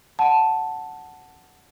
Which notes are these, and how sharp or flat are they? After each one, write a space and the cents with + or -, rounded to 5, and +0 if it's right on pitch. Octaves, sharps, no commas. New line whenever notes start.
F#5 +0 A5 +0